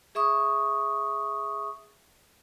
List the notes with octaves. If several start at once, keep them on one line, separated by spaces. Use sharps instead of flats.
G#4 E5 C#6 D#6